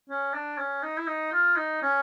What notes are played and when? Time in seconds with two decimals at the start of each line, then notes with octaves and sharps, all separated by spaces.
0.10 C#4
0.34 D4
0.58 C#4
0.83 D#4
0.97 E4
1.07 D#4
1.32 F4
1.56 D#4
1.82 C#4